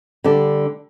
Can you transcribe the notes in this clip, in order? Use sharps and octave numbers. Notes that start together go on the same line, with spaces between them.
D3 G3 D4